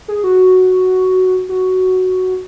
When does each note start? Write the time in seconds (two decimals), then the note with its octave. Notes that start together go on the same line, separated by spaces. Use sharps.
0.08 G#4
0.24 F#4
1.49 F#4